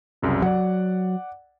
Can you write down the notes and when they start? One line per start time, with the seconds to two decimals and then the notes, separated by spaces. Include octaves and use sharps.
0.22 C2 F#2 C#3
0.42 F#3 D5 F#5